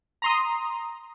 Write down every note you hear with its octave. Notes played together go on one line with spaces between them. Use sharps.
A#5 C6 D#6